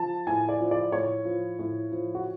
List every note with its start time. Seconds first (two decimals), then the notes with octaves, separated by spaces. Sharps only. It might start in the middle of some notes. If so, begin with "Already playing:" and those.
Already playing: F3 A5
0.27 A2 G#5
0.49 D5
0.60 F3
0.71 D5
0.92 A2 C#5
1.25 F3
1.59 A2
1.92 F3
2.15 F#4